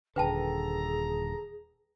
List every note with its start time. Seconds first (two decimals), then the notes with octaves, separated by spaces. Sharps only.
0.16 D#1 D3 G#4 A4 B4 G5 A5 A#5